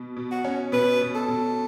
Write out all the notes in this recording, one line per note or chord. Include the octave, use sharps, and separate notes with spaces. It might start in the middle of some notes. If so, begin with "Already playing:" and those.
Already playing: B2
B2
F#4
C#4
B2 B4
B2
A4
B2